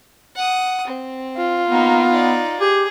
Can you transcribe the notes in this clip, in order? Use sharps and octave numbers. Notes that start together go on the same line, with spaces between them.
F#5 D#6
C4
F4
A#3 B3 D#4
D#4 D5
G4 G#4